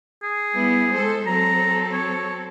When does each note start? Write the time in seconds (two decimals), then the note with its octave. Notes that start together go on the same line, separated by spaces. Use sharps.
0.23 G#4
0.54 G3 B3 E4
0.92 G#3 A4 C5
1.27 F#3 C4 A4 A#5
1.93 C#5